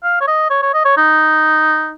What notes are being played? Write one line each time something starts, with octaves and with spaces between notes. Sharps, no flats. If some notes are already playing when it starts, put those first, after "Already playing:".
F5
C#5
D#5
C#5
C#5
D#5
C#5
D#4